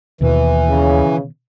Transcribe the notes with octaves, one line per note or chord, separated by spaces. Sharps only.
D#2 B2 D#3 E3
C#3